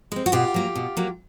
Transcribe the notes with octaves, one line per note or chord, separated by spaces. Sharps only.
G#3 C4
F#4
B2 F4 G4
F#3 A#3
B2
F#3 A#3